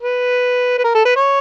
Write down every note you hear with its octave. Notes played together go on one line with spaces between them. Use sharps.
B4
B4
A#4
A4
B4
C#5